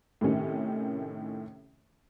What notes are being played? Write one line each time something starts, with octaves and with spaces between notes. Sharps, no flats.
A2 C3 D#3 C#4